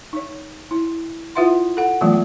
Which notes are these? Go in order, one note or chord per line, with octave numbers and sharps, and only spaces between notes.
D#4 C#5
E4
E4 F4 B4 E5 F#5 C6
A4 F#5
E3 F#3 G#3 A3 B3 F4